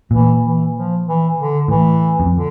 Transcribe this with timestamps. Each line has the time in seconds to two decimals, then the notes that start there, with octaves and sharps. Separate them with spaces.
0.11 A#2 E3
0.43 E3
0.74 F3
1.06 E3
1.37 D3
1.68 A2 E3
2.20 F2
2.31 D3